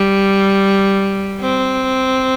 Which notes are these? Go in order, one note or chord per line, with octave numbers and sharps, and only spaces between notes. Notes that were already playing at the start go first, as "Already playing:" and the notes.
Already playing: G3
C4